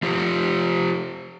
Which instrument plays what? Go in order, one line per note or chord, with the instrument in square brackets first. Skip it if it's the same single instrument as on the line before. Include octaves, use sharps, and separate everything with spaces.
[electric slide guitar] F3 F4 G4 C5